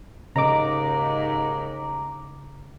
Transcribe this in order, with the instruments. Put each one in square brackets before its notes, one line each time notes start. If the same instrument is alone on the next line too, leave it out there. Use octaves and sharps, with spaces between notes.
[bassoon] D#2 [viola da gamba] G#2 [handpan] C#3 D#5 [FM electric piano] A#5 D6